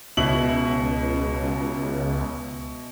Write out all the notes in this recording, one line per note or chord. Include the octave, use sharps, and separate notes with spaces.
C#2 B2 E4 F#7